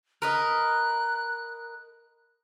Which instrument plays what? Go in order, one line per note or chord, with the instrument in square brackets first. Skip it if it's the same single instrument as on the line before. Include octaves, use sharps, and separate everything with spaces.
[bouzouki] A#4 B4 D#5 [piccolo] F#6